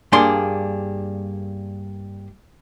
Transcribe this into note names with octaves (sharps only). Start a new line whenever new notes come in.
G2 A#3 D4 G#4 C6